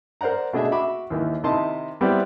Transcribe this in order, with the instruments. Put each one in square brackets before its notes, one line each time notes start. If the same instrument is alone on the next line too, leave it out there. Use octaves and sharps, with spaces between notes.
[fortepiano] A#4 C5 D5 F#5 A#5
B2 A3 D4 G#4 D#5 E5
F#4 E5 B5 D6
D#2 D#3 E3
C3 D#3 E4 D#5 A5 C6
G3 B3 C4 E4 G4 D5